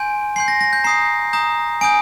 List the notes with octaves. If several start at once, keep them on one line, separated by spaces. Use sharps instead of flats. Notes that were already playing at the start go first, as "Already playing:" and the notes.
Already playing: G#5 C6 G6 D7
G#5 C6 G6 C7
A#6
A#6
G6
A#5 D#6 G6 C7
A#5 D#6 G6
G#5 D#6 G6 D7